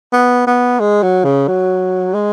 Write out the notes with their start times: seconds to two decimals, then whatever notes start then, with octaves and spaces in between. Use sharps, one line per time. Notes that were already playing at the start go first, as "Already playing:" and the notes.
0.13 B3
0.47 B3
0.80 G#3
1.03 F#3
1.24 C#3
1.48 F#3
2.14 G#3